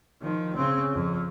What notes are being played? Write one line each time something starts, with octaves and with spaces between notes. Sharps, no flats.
D#3 F3
C#3 C4
F2